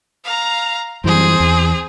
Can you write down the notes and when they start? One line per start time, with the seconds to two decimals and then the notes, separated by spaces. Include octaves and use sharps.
0.25 F5 A#5
1.04 F#2 E3 G3 C4 G#4
1.40 E2